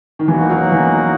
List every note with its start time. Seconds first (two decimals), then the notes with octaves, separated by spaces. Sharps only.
0.19 D#3
0.27 E2 B2 E3 A#3 D#4 F#4
0.50 F#3
0.72 E3